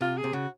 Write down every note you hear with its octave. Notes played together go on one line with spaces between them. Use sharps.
C3 F4
G#4
C3
C#3 F#4